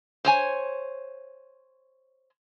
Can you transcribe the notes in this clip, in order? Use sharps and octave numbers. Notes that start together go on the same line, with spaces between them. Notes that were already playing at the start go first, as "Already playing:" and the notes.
C5 C#5 G#5